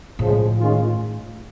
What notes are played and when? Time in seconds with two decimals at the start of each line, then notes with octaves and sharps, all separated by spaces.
0.19 A2 C#3 F3 G#3
0.59 D#3 G#3 C#4 F4